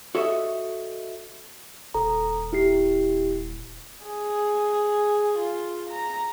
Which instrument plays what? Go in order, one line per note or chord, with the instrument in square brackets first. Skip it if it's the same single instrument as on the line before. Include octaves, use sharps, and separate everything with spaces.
[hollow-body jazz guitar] F#4 A4 C#5 D#5 E5
[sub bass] D#1 [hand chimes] A4 A#5
[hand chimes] E4 G4 C7
[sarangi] G#4
F4
A#5